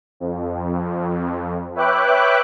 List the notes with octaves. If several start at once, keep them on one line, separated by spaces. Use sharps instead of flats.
F2
B4 C#5 E5 G5 D6 F#6